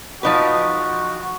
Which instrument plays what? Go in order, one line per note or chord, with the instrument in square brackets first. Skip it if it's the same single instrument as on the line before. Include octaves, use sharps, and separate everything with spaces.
[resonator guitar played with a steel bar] F3 D#4 B4 [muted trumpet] F#4